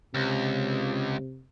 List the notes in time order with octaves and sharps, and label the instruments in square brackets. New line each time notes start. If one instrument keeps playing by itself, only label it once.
[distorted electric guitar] C#2 [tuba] C3